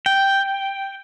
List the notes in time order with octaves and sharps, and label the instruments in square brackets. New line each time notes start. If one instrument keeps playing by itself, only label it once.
[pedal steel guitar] G5